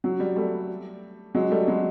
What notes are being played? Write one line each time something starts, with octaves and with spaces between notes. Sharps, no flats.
F#3
G3
G3 A3
F#3 G#3
G3 A3
F#3 G#3